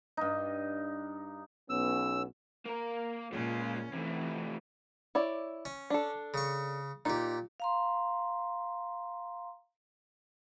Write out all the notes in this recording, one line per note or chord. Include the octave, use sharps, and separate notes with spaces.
G2 D#4
B1 B3 C#4 E6
A#3 A#4
A#2 G#3 C#4 F4
C3 E3 A3
E4 C#5 D5
C#4
D4 A4
C#3 C#6
A#2 D#4 G4
F5 A#5 C6